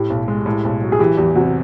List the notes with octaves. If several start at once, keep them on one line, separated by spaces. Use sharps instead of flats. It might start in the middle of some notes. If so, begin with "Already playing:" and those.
Already playing: A2 G4
B1
G#3
A2
B1
F#3
G#4
E3 G4
E2 G4
C3 F#4